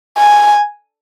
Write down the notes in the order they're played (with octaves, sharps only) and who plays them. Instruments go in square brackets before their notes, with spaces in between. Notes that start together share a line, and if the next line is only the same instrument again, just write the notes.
[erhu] G#5